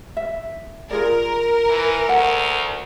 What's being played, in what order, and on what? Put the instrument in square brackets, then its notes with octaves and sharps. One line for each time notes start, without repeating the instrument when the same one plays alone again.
[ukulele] E5
[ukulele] F4 G#4 D5 [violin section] A#4
[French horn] E3
[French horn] D2 [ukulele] F#5